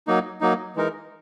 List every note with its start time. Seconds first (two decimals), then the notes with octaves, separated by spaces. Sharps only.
0.07 F#3 A#3 D#4
0.41 F#3 A#3 D#4
0.76 E3 G#3 D#4 A#4